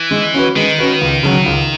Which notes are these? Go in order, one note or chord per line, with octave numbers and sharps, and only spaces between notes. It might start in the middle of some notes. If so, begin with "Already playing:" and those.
Already playing: E3
G#3
C#4 F#4 B4
D#3 G#3
C#4 F#4 B4
C#2
C#3 F#3
C#2